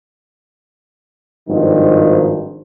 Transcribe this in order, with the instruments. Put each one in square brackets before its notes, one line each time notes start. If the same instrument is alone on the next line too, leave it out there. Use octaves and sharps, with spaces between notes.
[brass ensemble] G#1 G2 D#3 F3 D#4